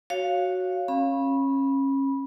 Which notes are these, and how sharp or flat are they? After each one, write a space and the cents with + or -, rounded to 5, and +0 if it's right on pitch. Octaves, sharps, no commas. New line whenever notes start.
F#4 +0 C#5 +0 F5 +0
C#4 -30 B5 -20